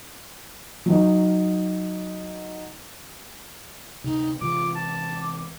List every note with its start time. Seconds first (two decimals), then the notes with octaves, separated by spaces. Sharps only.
0.86 F#3 D#4
4.04 D2 C3 D#4
4.41 C3 E3 G#3 F4 D6
4.75 A5 D6